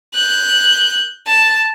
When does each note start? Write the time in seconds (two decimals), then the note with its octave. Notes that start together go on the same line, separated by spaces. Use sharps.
0.14 F#6 G6
1.27 A5